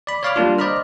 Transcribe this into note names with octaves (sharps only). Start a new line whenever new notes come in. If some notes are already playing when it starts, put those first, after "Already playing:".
D5 B5
C#5 D5 F5 B5 D6 F6
G3 A#3 D4 F4
C5 D5 D#5 A#5 B5 F6